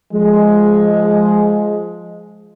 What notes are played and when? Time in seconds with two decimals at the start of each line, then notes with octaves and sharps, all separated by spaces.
0.13 F3 G#3